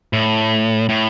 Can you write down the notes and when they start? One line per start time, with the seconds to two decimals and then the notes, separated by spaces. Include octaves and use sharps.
0.13 A2
0.89 A2